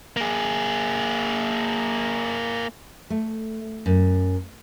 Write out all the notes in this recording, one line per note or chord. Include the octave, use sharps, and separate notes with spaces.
A#3 G#4
A3
F#2